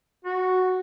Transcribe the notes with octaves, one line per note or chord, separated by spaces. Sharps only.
F#4